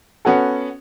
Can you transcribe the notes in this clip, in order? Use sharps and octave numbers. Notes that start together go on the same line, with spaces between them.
B3 C#4 F#4 A4